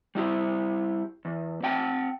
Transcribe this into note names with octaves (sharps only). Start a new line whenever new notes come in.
G3 E4 G4
E2
C4 F#5 G5 A5